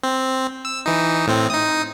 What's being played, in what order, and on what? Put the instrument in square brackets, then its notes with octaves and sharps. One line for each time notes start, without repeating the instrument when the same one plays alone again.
[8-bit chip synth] C4
E6
E3 D#4
A2 C4
D#4 D#6